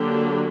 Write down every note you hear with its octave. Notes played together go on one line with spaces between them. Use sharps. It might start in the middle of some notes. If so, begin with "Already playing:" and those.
Already playing: D3 F#3 A#3 D4 G4